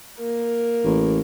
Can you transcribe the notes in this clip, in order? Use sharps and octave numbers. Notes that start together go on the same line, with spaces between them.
A#3 A#4
A1